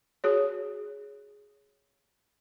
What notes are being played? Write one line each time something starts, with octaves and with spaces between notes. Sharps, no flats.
F#4 G#4 C#5